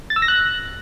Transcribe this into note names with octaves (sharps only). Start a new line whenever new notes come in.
A6
E6
A#6
F#6